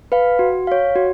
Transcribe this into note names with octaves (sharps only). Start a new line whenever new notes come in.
B4 F5
F#4
C#5 F5
F#4